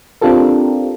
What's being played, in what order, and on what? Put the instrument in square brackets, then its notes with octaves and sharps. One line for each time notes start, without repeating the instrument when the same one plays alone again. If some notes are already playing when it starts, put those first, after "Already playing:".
[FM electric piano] C4 D4 F4 G4 A4 A#4